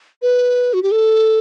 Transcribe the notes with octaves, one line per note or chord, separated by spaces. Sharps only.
B4
F#4
G4
A4